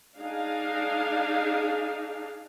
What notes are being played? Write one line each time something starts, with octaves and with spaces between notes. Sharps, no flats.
D4 D#4 G#4 F5